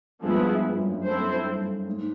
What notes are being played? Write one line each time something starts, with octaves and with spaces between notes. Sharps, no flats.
G2 F3 G#3 B3 E4 G#4
G2
F#2
G2
F#2 C4 E4 A4 C5
G2
G#2